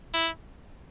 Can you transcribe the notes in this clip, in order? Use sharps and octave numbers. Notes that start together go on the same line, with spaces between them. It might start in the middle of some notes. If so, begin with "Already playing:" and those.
E4